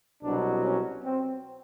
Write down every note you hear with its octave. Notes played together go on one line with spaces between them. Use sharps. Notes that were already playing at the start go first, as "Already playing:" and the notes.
C2 B2 F#3 D4
C#4
C4